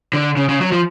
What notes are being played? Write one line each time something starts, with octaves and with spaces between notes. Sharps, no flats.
D3
C#3
C#3
F#3
F3